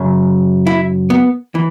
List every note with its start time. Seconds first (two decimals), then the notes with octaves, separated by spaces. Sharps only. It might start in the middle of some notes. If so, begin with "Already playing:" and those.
Already playing: F#2 C#3 F#3
0.67 E4
1.10 B3
1.55 E3